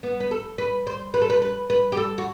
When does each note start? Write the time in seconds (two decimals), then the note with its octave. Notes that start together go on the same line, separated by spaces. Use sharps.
0.03 B3
0.20 B4
0.31 A4
0.58 B4
0.87 C5
1.14 B4
1.22 A4
1.30 B4
1.42 B4
1.70 B4
1.92 G4
1.97 A4
2.18 F#4